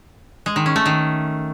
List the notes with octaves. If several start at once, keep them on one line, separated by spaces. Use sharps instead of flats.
G#3
D#3
C#4
A3
D#3